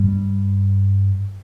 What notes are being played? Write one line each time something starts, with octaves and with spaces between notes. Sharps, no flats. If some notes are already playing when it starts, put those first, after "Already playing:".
Already playing: G2